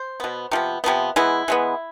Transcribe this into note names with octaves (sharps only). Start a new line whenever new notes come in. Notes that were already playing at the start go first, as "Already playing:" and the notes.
Already playing: C5
B2 B3
C3 F3 B3
C3 F3 B3
E3 G#3 B3 E4
E3 G#3 B3